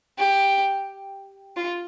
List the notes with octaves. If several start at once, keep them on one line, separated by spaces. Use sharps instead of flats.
G4
F4